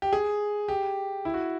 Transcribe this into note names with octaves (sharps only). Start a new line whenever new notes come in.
G4
G#4
G4
E4
F#4